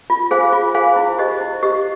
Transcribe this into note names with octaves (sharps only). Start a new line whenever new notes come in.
F4
G#4 C5 F5 G#5
F4
G#4 C5 F5 G#5
E4
G4 C5 D#5
E4
G4 C5 D#5